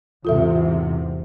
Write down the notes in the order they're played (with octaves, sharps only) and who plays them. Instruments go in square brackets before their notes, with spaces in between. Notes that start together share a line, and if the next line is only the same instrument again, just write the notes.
[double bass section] E2 G#2 C3 [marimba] F4 A4 E5